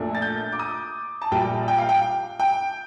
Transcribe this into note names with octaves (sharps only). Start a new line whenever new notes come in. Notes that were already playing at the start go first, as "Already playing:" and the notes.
Already playing: A#1 A#2 A3 D4
A6
G6
D6
D#6
A5
A#1 A#2 G3 G5
G5
F5
G5
G5